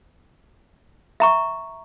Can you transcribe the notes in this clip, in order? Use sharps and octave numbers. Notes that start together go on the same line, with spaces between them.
E5 A#5 C#6